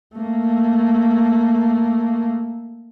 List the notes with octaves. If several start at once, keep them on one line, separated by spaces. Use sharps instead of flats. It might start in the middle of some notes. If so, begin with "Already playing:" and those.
A3 A#3